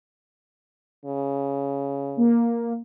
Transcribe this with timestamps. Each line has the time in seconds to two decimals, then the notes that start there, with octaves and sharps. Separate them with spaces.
1.05 C#3
2.17 A#3